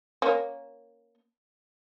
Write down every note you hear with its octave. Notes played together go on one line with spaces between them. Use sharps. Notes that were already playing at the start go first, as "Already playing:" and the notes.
A#3 C#4